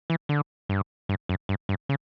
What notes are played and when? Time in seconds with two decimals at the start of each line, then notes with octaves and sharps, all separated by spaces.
0.10 E3
0.29 D3
0.69 G2
1.09 G2
1.29 F#2
1.49 G2
1.69 G2
1.89 C#3